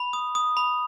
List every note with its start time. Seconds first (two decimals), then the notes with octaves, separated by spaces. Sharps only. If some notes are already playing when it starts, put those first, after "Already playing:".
Already playing: B5
0.13 D#6
0.35 D#6
0.57 B5